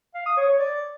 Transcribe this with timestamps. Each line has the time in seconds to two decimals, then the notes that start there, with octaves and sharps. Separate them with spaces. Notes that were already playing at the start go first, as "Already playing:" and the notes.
0.14 F5
0.26 D#6
0.37 C#5
0.48 C#5
0.59 D5